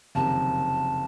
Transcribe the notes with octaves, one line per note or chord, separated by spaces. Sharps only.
F#1 F2 C3 D#3 A5